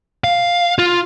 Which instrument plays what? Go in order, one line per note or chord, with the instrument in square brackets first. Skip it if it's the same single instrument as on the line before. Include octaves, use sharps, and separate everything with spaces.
[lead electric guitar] F5
F4